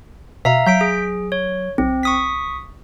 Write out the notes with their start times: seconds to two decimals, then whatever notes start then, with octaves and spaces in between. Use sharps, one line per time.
0.45 B2 E5 F5 A#5
0.66 F#3 G6 B6 D7
0.81 G#4
1.32 C#5
1.78 B1 C4
2.03 C#6 D#6 B6